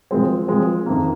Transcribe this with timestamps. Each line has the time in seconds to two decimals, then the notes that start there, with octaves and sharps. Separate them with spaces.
0.11 F3 G#3 C4
0.48 F3 G#3 C4
0.86 F2 D#3 A#3